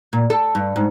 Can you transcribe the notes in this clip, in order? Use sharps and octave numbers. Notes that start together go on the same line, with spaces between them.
A#2
A4
G2
G#2